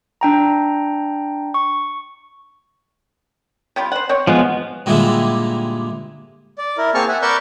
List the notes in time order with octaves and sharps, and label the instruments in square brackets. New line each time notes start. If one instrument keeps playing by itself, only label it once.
[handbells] D4 G5 A#5
C#6
[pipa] C3 G3 F4
C5 F#5
C4 C#5
[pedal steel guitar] F3 G#3 B3
[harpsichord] G2 A#2 D3 G3 G#3 E4
[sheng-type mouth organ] D5
E4 A#4
A#3 C4 G#4 A5 C#6 F6
E5 F#5 G#5
A#4 B4 D5 C#6 E6 G6